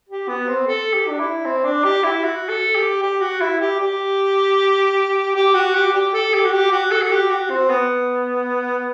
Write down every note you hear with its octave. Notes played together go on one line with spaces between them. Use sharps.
G4
B3
C4
A4
G4
D4
E4
C4
D4
G4
E4
F#4
A4
G4
G4
F#4
E4
G4
G4
G4
F#4
G4
G4
A4
G4
F#4
G4
F#4
A4
F#4
G4
F#4
C4
B3